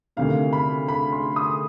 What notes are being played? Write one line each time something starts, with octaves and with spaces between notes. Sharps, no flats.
D2 C3 D#3 F5
B5
B5
C6
D#6